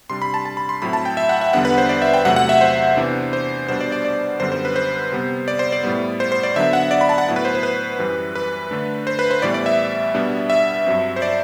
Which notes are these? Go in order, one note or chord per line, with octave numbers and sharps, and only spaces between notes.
C3 G3 D4 C6
B5
A5
A5
B5
C6
A2 F#3 C4 E4 B5
A5
G5
E5
F#5
E5
E2 D3 G3 B3 D4 F#5
B4
C5
D5
E5
G5
E2 C3 F#3 A3 F#5
F#5
E5
C5
C3 E3 B3 D4
C5
B2 G3 B3 D4 C5
D5
D5
D5
F#2 D3 G3 B3 C5
C5
B4
C5
C3 G3 B3
D5
C5
D5
A2 G3 B3
C5
C5
D5
D3 F#3 B3 D4 E5
F#5
D5
B5
A5
F#5
A2 F#3 B3 E4
B4
C5
C5
B4
F#2 E3 G3
B4
D3 A3 D4
C5
B4
C5
A2 E3 G3 B3 D5
D5
E5
B2 G3 B3 D4
E5
G2 F#3 C4
C5
D5